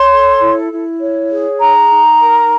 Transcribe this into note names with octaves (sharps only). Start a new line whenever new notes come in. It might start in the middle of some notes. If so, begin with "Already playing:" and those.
Already playing: C#5 C6
A4
E4
E4
C#5
G#4
D#4 A#5
D#4
A#4